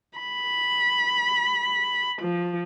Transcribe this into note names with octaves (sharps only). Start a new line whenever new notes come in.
B5
F3